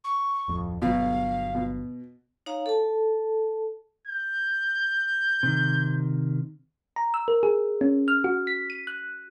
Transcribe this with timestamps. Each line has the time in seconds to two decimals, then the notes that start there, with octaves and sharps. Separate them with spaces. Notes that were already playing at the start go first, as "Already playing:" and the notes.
0.04 C#6
0.48 D1 F2
0.82 G1 B2 F#3 F5
1.55 B2
2.46 D#4 C#5 F5 A#5
2.66 A4 A5
4.08 G6
5.43 C3 D#3
6.96 A#5
7.14 E6
7.28 A#4
7.43 G#4
7.81 C#4
8.08 F6
8.24 F#4
8.47 B6
8.70 D#7
8.87 F#6